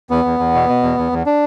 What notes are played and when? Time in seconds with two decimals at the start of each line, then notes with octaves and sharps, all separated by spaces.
0.10 E2 B3
0.25 E2
0.39 E2
0.55 B2
0.69 B2
0.83 E2
0.98 E2
1.12 E2
1.26 D4